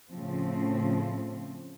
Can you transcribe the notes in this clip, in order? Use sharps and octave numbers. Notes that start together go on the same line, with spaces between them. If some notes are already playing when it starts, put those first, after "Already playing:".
A2 C#3 F3 C4